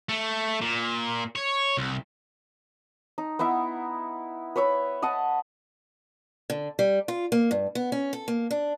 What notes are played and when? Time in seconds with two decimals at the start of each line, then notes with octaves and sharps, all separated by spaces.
0.09 A3
0.61 A#2
1.36 C#5
1.77 C2
3.18 D#4
3.39 B3 D#4 E4 E5
4.56 B4 C#5 E5 B5
5.02 D#5 F#5 A5
6.50 D3
6.79 G3
7.08 F4
7.32 A#3
7.51 G2
7.75 B3
7.92 C#4
8.13 A4
8.28 A#3
8.51 D4